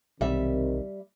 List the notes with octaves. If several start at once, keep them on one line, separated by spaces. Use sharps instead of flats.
B1 C3 D#3 G3 E5